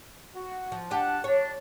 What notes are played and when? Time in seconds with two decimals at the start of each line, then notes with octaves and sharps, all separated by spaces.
0.32 F#4
0.72 F3
0.91 D4 G4 F#5 A5 F#6
1.24 D4 C#5